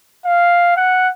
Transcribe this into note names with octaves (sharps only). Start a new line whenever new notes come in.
F5
F#5